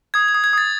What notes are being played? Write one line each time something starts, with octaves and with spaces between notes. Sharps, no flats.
D#6 G#6
G#6
D#6
G#6
D#6 A6